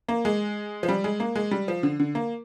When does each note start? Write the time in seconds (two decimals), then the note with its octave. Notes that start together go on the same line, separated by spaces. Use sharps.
0.09 A#3
0.25 G#3
0.83 F3
0.88 G3
1.04 G#3
1.20 A#3
1.35 G#3
1.51 G3
1.68 F3
1.83 D3
2.00 D3
2.15 A#3